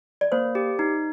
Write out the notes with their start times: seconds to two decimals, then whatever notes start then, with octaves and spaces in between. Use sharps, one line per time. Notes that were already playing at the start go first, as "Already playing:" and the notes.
0.21 D5
0.32 A#3 C5
0.55 G4
0.79 D#4